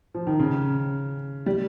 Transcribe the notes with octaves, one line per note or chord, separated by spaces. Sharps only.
F3
D#3
C#3
G3